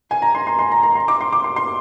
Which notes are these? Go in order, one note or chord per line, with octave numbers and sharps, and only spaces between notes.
G#5
A#5
C6
C6
C6
A#5
A#5
C6
D6
C6
D6
C6
C6